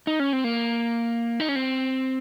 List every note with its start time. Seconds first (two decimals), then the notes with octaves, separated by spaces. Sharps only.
0.07 D#4
0.20 C#4
0.33 C4
0.44 A#3
1.40 D#4
1.49 C#4
1.56 C4